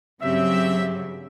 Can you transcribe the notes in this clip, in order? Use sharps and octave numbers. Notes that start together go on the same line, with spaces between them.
G2 C#3 F#3 C4 G4 E5